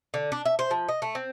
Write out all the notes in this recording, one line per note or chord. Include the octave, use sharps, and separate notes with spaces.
D3
D4
E5
C5
F3
D#5
A3
C4